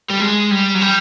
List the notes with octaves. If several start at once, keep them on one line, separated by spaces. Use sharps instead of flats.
G3
G#3
G3
F#3
G3